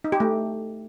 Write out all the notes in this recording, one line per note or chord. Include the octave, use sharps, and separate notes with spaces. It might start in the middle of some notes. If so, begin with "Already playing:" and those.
D#4
G4
A3